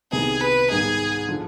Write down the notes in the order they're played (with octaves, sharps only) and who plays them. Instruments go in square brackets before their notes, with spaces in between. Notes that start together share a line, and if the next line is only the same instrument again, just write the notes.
[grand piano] C2 C3 D#3 B3 D#4 [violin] G#4
[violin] B4
[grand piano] G#2 D#3 G3 B3 D#4 [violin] G#4
[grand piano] D3 F3